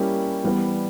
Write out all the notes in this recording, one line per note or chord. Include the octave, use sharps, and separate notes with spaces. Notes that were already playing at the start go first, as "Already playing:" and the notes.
Already playing: G3 A#3 C#4 E4 G4
E3 G3 B3